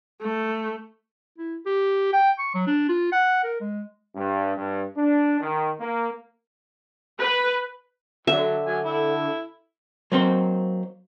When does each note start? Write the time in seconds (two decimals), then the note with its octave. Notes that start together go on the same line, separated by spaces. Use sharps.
0.21 A3
1.38 E4
1.66 G4
2.13 G5
2.38 C#6
2.54 F#3
2.67 D4
2.89 F4
3.12 F#5
3.43 A#4
3.60 G#3
4.15 G2
4.56 G2
4.96 D4
5.41 D#3
5.80 A#3
7.19 B4
8.27 D3 F#3 E5
8.66 F#3 G#5
8.85 E4 A4
10.12 F#3 A#3 C4 D#4 C5